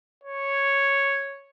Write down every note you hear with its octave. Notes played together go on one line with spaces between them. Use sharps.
C#5